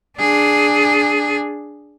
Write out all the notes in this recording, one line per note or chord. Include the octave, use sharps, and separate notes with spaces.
D4 G#4